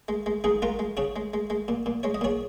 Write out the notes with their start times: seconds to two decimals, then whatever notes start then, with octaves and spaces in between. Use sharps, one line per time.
0.08 G#3
0.26 G#3
0.44 G#3 D#4 G#4
0.62 G#3 F4 A#4
0.79 G#3
0.97 C#3 G#4 C#5
1.16 G#3
1.34 G#3
1.50 G#3
1.68 A#2
1.86 A#2
2.03 G#3 C#5
2.14 D#5
2.21 A#2 G#4 C#5